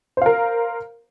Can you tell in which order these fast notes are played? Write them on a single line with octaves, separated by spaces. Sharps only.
C5 F5 A#4